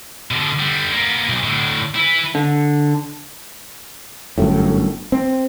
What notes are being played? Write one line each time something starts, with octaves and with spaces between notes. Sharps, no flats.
B2 D3
D3 G3
A#3 B3
B1
A2 D3
E4 B4
D3
G1 F#2 A2
C4